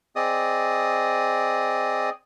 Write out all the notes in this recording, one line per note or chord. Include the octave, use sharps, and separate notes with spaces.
C4 G#4 D5 D#5 D#6